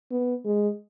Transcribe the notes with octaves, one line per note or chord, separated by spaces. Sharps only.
B3
G#3